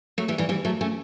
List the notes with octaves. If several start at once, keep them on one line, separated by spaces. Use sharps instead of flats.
F#3 A3
E3 G3
E3 G3
E3 G3
F#3 A3
A3 C#4